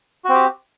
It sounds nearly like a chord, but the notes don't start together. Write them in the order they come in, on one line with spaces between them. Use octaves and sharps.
F#4 C4 G4